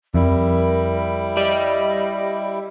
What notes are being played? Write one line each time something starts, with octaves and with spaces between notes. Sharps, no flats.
F2 G3 E4 A#4
G4 D5 D#5